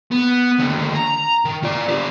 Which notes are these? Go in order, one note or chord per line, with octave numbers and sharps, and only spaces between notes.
B3
D#2 D3
A#5
D#3
F4 D5
D3 G4